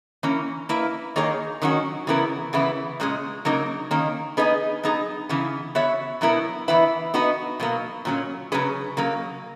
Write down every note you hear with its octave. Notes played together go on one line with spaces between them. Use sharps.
E3 A#3 C#4
A#3 E4 B4 E5
D#3 A#3 D#4 G#4 C#5
D#3 F#3 C#4 F#4
C#3 E3 B3 E4 A#4
C#3 E3 B3 E4
A#2 G#3 C#4 G#4
C#3 F#3 A#3 D#4 A#4
D#3 A#3 C#4
B3 D#4 G#4 B4 D#5
F#3 B3 D#4 G#4
C#3 E3 B3
B3 F#4 C#5 E5
B2 F#3 B3 E4 A#4
E3 B3 E4 B4 E5
B3 D#4 F#4 B4
B2 F#3 A#3
A#2 F#3 C#4
C#3 F#3 C#4 G#4 B4
C#3 F#3 A#3